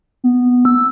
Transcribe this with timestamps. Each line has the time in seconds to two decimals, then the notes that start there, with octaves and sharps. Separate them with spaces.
0.24 B3
0.65 E6